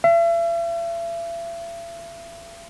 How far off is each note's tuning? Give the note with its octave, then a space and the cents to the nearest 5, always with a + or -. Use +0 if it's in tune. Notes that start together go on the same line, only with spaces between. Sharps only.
E5 +40